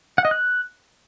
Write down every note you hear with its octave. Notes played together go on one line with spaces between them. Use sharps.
F#5
D#5
F#6